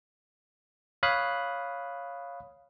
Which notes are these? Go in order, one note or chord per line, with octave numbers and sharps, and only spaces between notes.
C#5 F5 B5 D#6 F#6